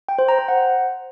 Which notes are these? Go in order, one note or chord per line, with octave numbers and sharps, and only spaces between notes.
G5
C5
A#5
C5
F#5